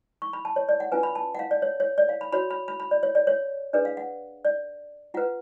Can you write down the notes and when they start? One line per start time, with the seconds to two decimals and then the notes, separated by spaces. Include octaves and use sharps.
0.22 C#6
0.33 B5
0.45 A5
0.56 C#5
0.69 D5
0.80 F#5
0.92 C#4 F4 B4 G#5
1.03 B5
1.15 A5
1.35 F#5
1.39 F5
1.51 D5
1.62 C#5
1.80 C#5
1.98 D5
2.09 F5
2.21 B5
2.32 F#4 C#5 B5
2.50 B5
2.68 B5
2.80 B5
2.91 D5
3.03 C#5
3.15 D5
3.27 C#5
3.73 D4 G#4 B4 D5
3.85 F5
3.97 F#5
4.45 D5
5.14 F4 B4 F#5